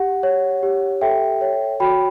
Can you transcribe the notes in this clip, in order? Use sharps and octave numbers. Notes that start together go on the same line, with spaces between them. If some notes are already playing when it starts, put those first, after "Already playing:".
Already playing: G4 F#5
C#5
G4
A4 E5 G5
C#5
F#4 G5 B5